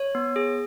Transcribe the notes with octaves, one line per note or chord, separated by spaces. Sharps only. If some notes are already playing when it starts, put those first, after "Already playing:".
Already playing: C#5
B3
G#4